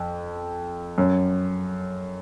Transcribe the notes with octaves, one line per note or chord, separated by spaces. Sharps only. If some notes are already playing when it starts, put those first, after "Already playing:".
Already playing: F2
F#2